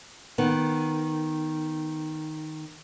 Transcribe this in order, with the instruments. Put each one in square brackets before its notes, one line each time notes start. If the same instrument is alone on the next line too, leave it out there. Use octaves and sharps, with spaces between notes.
[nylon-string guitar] D#3 B3